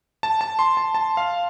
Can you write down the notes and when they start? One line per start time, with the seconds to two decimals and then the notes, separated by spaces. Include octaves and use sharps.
0.23 A5
0.41 A5
0.59 C6
0.77 A5
0.95 A5
1.17 F5